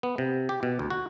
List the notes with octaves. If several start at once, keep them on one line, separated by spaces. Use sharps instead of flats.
B3
C3
G4
B2
D2
F#4